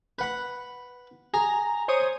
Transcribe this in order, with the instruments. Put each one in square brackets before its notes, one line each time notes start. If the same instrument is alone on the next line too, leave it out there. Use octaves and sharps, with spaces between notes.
[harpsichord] B4 F#5 B5
[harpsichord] G#4 [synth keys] A#5
[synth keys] C5 C#5 D#6